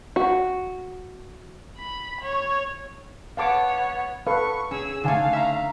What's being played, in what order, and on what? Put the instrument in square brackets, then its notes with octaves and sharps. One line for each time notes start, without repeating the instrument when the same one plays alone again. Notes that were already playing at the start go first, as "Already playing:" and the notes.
[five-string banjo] F#4
[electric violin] B5
C#5
[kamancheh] B3 C#5 [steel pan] F5 A5 D6
[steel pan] A4 B4 F5 [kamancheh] C#6
[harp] C#4 [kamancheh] G#4 E6
[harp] D3 A3 [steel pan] D#4 G#5 [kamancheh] F5
[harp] E5 A#5